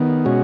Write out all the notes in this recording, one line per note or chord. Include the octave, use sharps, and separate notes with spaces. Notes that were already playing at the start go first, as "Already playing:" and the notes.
Already playing: D#3 B3
B2 G#3 C#4 F#4